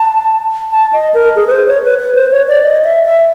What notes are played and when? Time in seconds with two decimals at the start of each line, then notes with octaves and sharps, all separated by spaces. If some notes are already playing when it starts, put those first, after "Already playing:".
Already playing: A5
0.72 A5
0.93 D#5
1.14 A#4
1.36 G#4
1.47 B4
1.51 C5
1.68 C#5
1.84 B4
1.99 B4
2.15 C5
2.32 C#5
2.48 D5
2.63 D#5
2.84 E5
3.06 E5